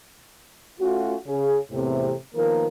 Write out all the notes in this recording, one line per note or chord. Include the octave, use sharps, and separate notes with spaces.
A3 C#4 F4 F#4
C#3 C#4 G#4
E2 A2 C3
D#3 F3 A#3 B3 A#4